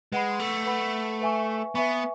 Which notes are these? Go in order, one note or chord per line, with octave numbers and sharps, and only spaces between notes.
G#3 B4 F#5 B5
A3
B4 F#5 B5
B4 E5 G#5 C#6
B3 B4 E5 G#5 C#6